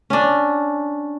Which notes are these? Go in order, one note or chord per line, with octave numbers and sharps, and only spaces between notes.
C#4 D4